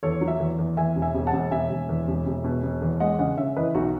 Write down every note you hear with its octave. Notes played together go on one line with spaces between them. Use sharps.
E2 A4 C#5
F#3
C#5 E5
E2
E2
E2 E5 G#5
E1
E5 G#5
E1
F#5 A5
E1
E1 E5 G#5
E1
E2
E1
E1
B2
E1
E2
G#3 D#5 F#5
C#3 D#5 F#5
C#3 C#5 E5
E3 B4 D#5
B1 D#4 F#4